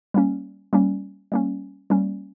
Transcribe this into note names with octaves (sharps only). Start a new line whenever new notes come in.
G3 A#3 C#4
G3 A#3 C#4
G3 A#3 C#4
G3 A#3 C#4